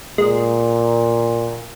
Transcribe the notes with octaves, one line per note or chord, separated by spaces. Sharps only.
A#2 G#3